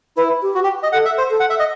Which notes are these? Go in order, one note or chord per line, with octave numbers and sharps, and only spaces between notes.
E4 B4
G4
F#4
G4
D#5
A4 F#5
E5
C5
A4
F#5
E5
D#5